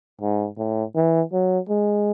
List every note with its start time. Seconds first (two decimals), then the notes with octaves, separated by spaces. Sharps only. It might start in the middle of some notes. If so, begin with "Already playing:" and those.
0.21 G#2
0.58 A2
0.96 E3
1.33 F#3
1.69 G#3